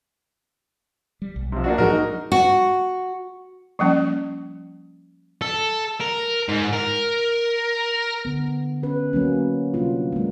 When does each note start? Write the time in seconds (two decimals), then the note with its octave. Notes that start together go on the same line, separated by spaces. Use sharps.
1.22 G3
1.36 B1
1.52 C3 F3
1.64 A#3 D4 F#4
1.78 A2 F3 F#3 G#3 F#4 A#4
1.90 D4 D#4
2.32 F#4
3.79 F3 G3 A#3 C#4
5.41 A4
6.00 A#4
6.48 G#2
6.73 A#4
8.25 D3 B3
8.83 C#4 B4
9.13 F#3 A#3 C#4
9.74 C3 G3 A#3 D4 F4
10.12 G#3 A#3